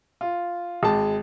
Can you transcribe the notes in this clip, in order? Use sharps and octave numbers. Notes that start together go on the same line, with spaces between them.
F4
G#1 G#3 A5